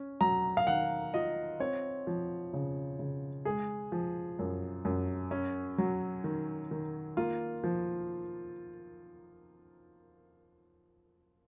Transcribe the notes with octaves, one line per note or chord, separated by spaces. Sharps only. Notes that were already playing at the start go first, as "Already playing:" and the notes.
Already playing: C#4
F#3 A#5
F5
D#3 F#5
F4 D#5
C4 C#5
F3
C#3
C#3
G#3 G#4
F3
F#2
F#2
C#4
F#3
D#3
D#3
A#3 F4
F3